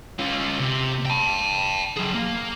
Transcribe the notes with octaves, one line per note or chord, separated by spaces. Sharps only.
C#4 F4
C3
G5 A5
F#3 G#4
A#3